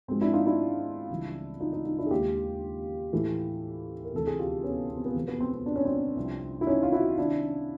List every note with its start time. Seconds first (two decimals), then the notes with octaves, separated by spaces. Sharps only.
0.08 G#2 F3 G#3 C4
0.21 D4 E4
0.33 D#4 F4
0.46 D4 E4
1.10 C#2 C#3 E3 G3
1.60 D#4 F4
1.73 D#4 F4
1.85 D#4 F4
1.98 D4 E4
2.06 G#4
2.10 D#2 D#3 G#3 F4 G4
3.12 A2 E3 A3
4.05 A#4
4.13 D2 C3 E3 A3 A4
4.27 G#4
4.39 F4 G4
4.64 B3 C#4
4.90 B3
4.98 C4
5.06 B3
5.14 E2 C3 F3
5.28 B3
5.40 C4
5.54 C4
5.66 D4
5.76 C#4
5.85 C4 D4
6.17 C2 C3 F3
6.61 E4
6.67 C#4 D#4
6.83 F4
6.92 E4 F#4
7.18 C3 D#3 D4 E4